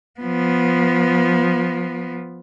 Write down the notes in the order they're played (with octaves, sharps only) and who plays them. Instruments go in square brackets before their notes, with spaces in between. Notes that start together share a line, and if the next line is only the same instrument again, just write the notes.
[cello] F3 B3